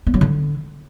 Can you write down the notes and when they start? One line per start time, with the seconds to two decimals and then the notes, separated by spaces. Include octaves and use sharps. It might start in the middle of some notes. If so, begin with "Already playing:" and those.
0.07 B3
0.14 F#3
0.21 D3